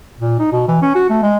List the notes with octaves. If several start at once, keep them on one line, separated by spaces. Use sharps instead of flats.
A#2
D#4
B2
E3
C#4
F#4
A3
G#3